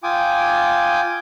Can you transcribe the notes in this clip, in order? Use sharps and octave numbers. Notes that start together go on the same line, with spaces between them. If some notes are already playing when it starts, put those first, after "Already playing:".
F4 G5 G#5 D6 D#6